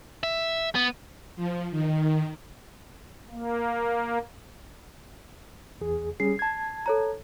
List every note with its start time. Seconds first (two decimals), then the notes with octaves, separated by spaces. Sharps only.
0.23 E5
0.75 B3
1.36 F3
1.71 D#3
3.30 A#3
5.81 E2 G#4
6.20 G3 C#4 G#4 C7
6.39 A5 G#6
6.86 A4 C#5 A#5